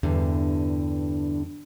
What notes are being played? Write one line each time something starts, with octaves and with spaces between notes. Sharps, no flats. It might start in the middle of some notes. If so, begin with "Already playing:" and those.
E2 G2 D3